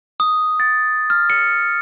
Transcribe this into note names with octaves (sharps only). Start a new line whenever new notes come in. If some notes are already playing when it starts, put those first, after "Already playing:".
D#6
A6
F6
C#7